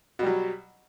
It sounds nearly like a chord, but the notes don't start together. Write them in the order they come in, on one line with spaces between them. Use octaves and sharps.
B2 G3 F#3